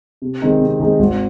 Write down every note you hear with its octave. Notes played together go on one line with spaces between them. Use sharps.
C3
D#3 G#3 C4 D#4
C3
D#3 G#3 C4 D#4
G#1